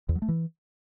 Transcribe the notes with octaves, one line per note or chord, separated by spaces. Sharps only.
E2
F#3
A3
E3